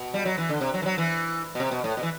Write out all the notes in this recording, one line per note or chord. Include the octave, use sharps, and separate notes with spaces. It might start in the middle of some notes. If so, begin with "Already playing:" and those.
Already playing: B2
G3
F#3
E3
D3
C3
F#3
E3
F#3
E3
B2
C3
B2
A2
B2
E3